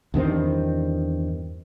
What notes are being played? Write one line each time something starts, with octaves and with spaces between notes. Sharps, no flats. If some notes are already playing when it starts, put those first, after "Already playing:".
E2 G2 D#3 C4